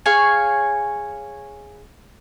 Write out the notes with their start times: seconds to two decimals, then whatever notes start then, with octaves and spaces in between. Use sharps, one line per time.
0.06 G#4 C#5 F5 G#5